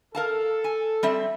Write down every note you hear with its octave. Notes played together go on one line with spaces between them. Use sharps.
A4 A#4 F5 A5
G#5
G3 C4 E5